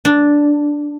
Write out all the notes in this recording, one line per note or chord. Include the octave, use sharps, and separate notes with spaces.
D4